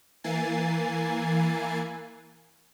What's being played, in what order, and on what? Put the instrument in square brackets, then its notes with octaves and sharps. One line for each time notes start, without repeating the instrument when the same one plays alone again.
[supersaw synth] E3 A#3 G#5 A6 C7